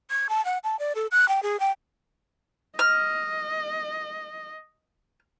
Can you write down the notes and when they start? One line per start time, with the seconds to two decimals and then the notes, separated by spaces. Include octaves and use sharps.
0.10 G#6
0.29 A5
0.45 F#5
0.64 A5
0.79 D5
0.95 A4
1.11 F#6
1.28 G5
1.43 G#4
1.60 G5
2.79 D#5 F6